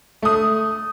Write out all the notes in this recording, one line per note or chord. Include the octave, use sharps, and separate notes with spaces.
A3 D#6